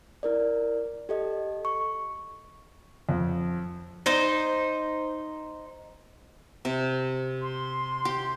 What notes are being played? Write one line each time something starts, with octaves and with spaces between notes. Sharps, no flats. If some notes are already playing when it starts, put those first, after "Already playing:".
E4 A#4 D5
G4 A4 D#5
C#6
F2
D#4 C5
C3
C6
G4